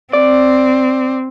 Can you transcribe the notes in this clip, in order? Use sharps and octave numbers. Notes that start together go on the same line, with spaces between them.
C4 D5